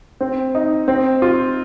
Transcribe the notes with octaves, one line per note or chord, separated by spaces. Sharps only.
C4
D#4
C4
F4